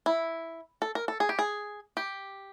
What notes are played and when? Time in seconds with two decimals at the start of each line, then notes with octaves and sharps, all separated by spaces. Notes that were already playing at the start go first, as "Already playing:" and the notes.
0.06 E4
0.82 A4
0.95 A#4
1.08 A4
1.20 G#4
1.29 G4
1.39 G#4
1.97 G4